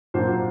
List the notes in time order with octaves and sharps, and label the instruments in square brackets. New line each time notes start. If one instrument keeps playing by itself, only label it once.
[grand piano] A#2 F#3 A#3 D4 C5